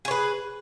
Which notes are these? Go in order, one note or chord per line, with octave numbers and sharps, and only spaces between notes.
G#4 B4 C#5